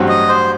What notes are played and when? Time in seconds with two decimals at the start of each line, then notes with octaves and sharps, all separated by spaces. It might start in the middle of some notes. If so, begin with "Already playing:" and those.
Already playing: A1 G2 F#3 C4 F#4
0.08 D#5
0.29 C5